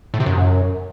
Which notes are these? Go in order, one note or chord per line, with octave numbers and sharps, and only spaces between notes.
A2
C3
F#2